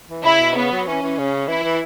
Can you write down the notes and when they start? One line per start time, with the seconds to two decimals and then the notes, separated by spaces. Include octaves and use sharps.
0.09 E3
0.24 C#3 E4
0.40 B2
0.55 C#3 B3
0.71 F#3
0.87 E3 C#4
1.02 E3
1.18 C#3
1.48 E3 E4
1.64 E3